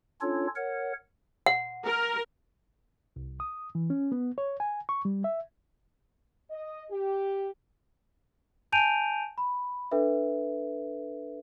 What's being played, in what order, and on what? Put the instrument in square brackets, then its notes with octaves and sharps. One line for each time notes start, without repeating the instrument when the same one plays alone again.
[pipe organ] C#4 D4 F4 A4 C#5
A#4 C#5 F#5
[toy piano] F#5
[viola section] A#4
[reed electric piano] C2
D#6
E3
C#4
B3
C#5
G#5
C#6
G3
E5
[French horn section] D#5
G4
[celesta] G#5 A5 G6 D7 D#7 F7
B5
D4 A4 B4 E5